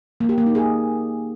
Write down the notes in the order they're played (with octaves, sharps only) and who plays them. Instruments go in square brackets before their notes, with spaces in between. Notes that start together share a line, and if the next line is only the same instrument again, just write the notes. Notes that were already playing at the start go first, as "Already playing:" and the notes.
[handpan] A#3
G4
A#3
D#4
G#4